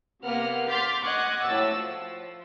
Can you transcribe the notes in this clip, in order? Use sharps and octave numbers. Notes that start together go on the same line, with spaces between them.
C3 A#3 B3 F#5 F6
C6 D6 F6 G6 A6 B6
D#5 F#5 C#6 D6 F#6 G#6
A2 F#4 E6 A6
F3